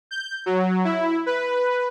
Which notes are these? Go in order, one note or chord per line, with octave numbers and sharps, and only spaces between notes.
G6
F#3
E4
B4